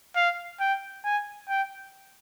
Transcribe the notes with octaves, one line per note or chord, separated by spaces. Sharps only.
F5
G5
G#5
G5